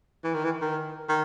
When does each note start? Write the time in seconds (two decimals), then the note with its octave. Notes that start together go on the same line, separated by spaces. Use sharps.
0.24 E3
0.34 D#3
0.45 E3
0.61 D#3
1.09 D#3